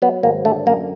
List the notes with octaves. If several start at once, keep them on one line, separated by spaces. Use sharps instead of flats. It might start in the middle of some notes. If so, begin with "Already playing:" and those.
F#3 B3
G#1 A#3
D3 A3
F#2 A#3